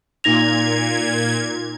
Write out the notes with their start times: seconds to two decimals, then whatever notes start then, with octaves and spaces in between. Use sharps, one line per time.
0.24 A#2 D#4 G#6 A#6 F7